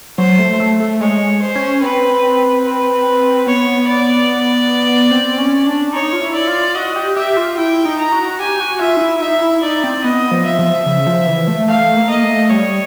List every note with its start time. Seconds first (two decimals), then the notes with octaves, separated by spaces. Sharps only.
0.18 F#3 C5
0.39 A3
0.60 A3
0.80 A3
1.00 G#3 C#5
1.41 C5
1.55 C#4
1.82 C4 B4
2.65 B4
3.47 B3 C#5
3.87 D5
5.11 C4
5.38 C#4
5.66 D4
5.93 D#4 C#5
6.13 F4
6.21 E4
6.35 D5
6.48 F4
6.75 F#4 D#5
6.96 G4
7.16 G4 E5
7.37 F4
7.57 E4 G5
7.85 D#4
7.99 A#5
8.12 F#4
8.39 G4 G#5
8.60 F#4
8.81 F4 E5
8.97 D#4
9.01 E4
9.21 D#4 E5
9.42 E4
9.63 D#4 D5
9.84 C4
10.04 B3 D#5
10.31 F3
10.46 E5
10.59 F3
10.86 C#3
11.06 F3
11.27 E3
11.48 A3
11.68 A3 F5
11.96 A#3
12.10 D#5
12.23 A3
12.50 G3 C#5